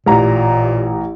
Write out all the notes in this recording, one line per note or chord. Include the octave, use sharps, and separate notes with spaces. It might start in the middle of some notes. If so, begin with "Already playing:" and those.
A1 A#2 G4 A#5